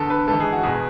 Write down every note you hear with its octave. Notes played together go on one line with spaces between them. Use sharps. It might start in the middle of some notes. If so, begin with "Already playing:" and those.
Already playing: E2 D3 A4
B4
G#2 E3 A4
G#4
F#4
E2 B2 G#4